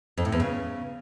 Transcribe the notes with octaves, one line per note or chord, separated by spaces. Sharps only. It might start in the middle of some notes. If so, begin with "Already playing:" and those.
F2
A2
E2
C#3